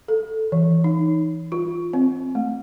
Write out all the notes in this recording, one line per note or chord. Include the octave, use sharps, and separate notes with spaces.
A4
E3
D#4
F4
C4
A3